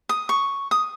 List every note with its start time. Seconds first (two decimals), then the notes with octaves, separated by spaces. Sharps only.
0.09 D#6
0.29 C#6
0.71 D#6